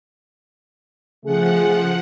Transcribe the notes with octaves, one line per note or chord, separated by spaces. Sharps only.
C#3 F3 A3 G#4 F#5